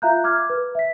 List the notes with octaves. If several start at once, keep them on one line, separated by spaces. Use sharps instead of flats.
F4 E5 F5 A#5 F#6 G6
D6 F6 G#6
B4
E5 B6